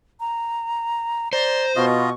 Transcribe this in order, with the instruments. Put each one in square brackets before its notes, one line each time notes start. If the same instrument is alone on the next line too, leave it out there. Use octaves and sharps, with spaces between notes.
[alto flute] A#5
[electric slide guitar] C5 [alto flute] D5 [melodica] A#5
[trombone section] B2 [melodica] F4 D#5 [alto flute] C#6